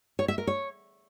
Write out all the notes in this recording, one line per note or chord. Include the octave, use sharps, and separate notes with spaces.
C#5
E5
A#4
C#5